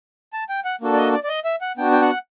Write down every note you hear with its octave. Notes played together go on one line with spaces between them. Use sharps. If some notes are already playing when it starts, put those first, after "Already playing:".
A5
G5
F#5
A#3 D4 F#4 A4
D5
D#5
D5
D5
D#5
E5
F#5
B3 D4 F#4 G5
G5
F#5